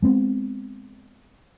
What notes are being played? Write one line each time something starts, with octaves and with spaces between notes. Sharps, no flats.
G#3 B3 C4